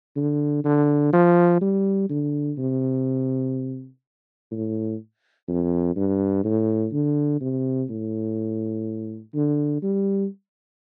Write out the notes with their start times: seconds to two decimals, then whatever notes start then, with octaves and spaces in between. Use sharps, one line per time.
0.16 D3
0.65 D3
1.13 F3
1.61 G3
2.09 D3
2.58 C3
4.51 A2
5.48 F2
5.96 G2
6.44 A2
6.93 D3
7.41 C3
7.90 A2
9.34 D3
9.82 G3